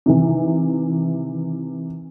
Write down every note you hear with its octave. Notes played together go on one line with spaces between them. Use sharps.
C3 D#3 E3